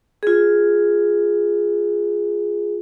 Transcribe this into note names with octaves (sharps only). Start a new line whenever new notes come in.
F4 G#4